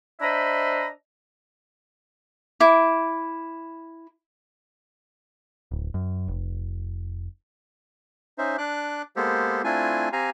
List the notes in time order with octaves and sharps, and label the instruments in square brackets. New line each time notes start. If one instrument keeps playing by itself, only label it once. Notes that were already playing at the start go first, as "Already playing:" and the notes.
[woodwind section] D4 C5 D#5 E5 A#5 B5
[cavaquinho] E4 D6
[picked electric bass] D1
F#2
F1
[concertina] C#4 D#4 C5 E5
D4 D6 F#6
G#3 A#3 B3 G4 A4 C5
A3 C4 D4 E4 F4 G#5
C4 G4 F5 G#5 A#5